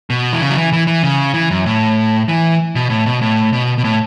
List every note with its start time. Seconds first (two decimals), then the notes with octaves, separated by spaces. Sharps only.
0.10 B2
0.33 E3
0.41 C#3
0.50 F#3
0.57 E3
0.73 E3
0.87 E3
1.03 C#3
1.34 E3
1.51 F#2
1.66 A2
2.28 E3
2.75 B2
2.90 A2
3.06 B2
3.21 A2
3.53 B2
3.78 B2
3.84 A2